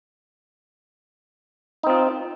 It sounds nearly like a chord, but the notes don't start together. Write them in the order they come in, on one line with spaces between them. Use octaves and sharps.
D#4 C4 F4